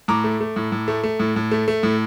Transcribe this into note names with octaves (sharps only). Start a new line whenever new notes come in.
A2 A#5 D6
A3
A3
A2
A2
A3
A3
A2
A2
A3
A3
A2